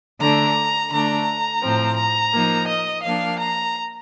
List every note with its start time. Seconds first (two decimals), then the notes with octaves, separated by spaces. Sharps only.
0.19 D3 A3 D4 A#5
0.91 D3 A3 D4 A#5
1.61 A2 F3 C4
1.96 A#5
2.33 F3 A#3 D#4
2.67 D#5
3.02 F3 A#3 D4 F5
3.39 A#5